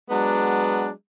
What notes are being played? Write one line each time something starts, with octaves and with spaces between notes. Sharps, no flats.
F#3 G#3 B3 D4